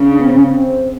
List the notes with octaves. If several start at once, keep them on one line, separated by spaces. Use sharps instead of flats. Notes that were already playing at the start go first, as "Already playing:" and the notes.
Already playing: C#3
D4
B3
C4
C#4
C4